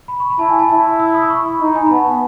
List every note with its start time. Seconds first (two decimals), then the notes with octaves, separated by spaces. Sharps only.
0.08 B5
0.20 C#6
0.30 B5
0.39 E4 A5
0.49 G#5
0.59 A5
0.69 E4 A5
1.00 E6
1.14 D#6
1.25 B5
1.30 C#6
1.46 B5
1.60 D#4
1.75 G#5
1.86 B5
1.91 B3 A5
2.06 G#5